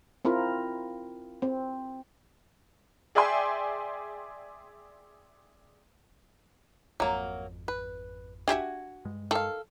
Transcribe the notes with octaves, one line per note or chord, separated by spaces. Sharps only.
C4 E4 F4 A#4
C4
G#4 D5 E5 G5 G#5 C6
G#1 F2 F#3 A#3
B4
D4 F#4 G4 E5 G#5
G2 G#3
D#3 A4 F5